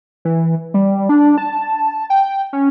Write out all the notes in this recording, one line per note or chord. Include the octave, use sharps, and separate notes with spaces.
E3
G3
D4
A5
G5
C#4